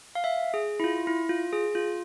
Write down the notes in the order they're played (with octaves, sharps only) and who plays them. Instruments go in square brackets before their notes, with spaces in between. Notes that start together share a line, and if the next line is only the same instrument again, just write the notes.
[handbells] F5
E5
G#4
E4
F4
E4
F4
G#4
F4